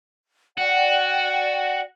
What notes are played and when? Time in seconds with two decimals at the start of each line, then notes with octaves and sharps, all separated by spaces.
0.58 F#4 D5 F#5 G5